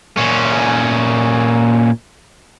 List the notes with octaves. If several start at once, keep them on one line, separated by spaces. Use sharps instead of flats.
A#2 C#4